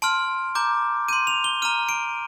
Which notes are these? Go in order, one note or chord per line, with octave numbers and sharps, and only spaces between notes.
A5 C6 F6 D7
A#5 D6 G6
C6 G6 D#7
F7
G7
A#5 F6 D#7
D7